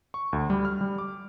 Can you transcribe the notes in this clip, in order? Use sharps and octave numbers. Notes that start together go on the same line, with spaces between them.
C#6
D2
G3
F6
G3
D6